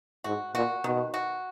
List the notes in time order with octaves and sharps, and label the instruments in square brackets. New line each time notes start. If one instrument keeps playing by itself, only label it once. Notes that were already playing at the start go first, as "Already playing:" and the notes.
[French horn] G#2 [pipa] F#4
[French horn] A#2 [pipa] F#4
[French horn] B2 [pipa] D#3
[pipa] F#4